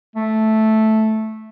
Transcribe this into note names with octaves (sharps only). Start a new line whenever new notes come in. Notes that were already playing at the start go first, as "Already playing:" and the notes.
A3